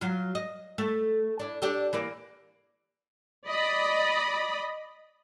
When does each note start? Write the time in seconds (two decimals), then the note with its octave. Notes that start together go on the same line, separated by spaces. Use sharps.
0.01 F#3 F4
0.35 D#5
0.78 A3
1.39 D4 E4
1.62 D4 G4 A4
1.93 E3 A#3 D5
3.47 D5 D#5 B5